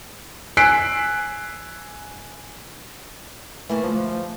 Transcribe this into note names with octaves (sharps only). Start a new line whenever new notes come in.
G#5 E6 F#6 B6 C7 D7
E3 A3 A#3 A#4
D2 G#2 F3